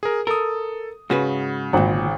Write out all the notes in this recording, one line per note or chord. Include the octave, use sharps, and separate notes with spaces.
G#4 A#4
A4 A#4 D#6
G#2 C#3 F#4 B4
G#1 D2 A#2 F#5